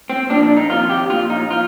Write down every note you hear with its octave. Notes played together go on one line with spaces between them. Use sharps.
C4
A#2 F3 D4
D4
D#4
F2 C3 D#3 F4
G4
A#2 F3 F4
D#4
F3 F4